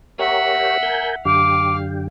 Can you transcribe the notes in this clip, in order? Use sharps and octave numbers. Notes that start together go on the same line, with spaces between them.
G4 A#4 C#5 E5 F#5
A#4 G#5 G6
F#2 D3 G4 F5 D6